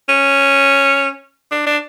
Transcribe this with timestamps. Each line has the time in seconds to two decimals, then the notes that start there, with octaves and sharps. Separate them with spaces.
0.09 C#4
1.51 D4
1.66 D4